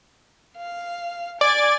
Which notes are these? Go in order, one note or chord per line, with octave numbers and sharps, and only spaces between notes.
F5
D5 G#5 A6